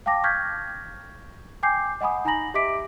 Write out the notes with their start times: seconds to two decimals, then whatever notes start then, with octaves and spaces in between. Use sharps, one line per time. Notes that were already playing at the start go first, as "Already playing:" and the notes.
0.06 F5 G5 A5 D6 A#6
0.24 C#6 F6 G6 G#6 B6
1.63 G5 G#5 D6 G6 C7
2.01 D#5 F#5 G#5 B5 D#6
2.25 D#4 G#5 A#5 B5 A#6 F#7
2.54 G4 D#5 E5 D6 B6 D7